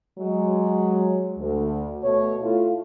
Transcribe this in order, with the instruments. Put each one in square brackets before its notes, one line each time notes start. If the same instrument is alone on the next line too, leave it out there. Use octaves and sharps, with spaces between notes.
[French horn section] F#3 G#3
D2
B2 A3 C#5
A3 E4 F4